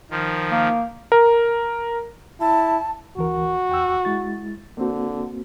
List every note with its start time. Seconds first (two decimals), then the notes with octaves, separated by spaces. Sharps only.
0.11 D#3 F3
0.51 A#3
1.12 A#4
2.41 E4 A5
3.17 D2 E3 F#4 A#4
3.69 E2 G5 E6
4.05 G#3 E4 A6
4.78 D3 A#3 C4 F#4